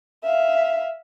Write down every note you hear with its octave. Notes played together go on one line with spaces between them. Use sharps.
E5 F5